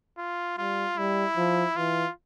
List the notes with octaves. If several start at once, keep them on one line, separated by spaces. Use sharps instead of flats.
F4
G3 F4
G3 E4
F3
E3 F4